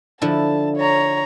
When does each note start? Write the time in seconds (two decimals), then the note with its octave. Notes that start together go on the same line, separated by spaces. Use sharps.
0.22 D3 F3 E4 A5
0.77 C#5 A#5